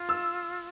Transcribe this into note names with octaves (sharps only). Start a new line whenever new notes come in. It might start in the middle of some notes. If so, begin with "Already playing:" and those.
Already playing: F4
E6